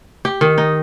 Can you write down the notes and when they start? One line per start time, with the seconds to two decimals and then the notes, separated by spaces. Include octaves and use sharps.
0.25 G4
0.41 D#3
0.58 D#4